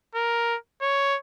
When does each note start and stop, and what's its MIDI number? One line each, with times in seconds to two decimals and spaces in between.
0.15 0.56 70
0.82 1.17 73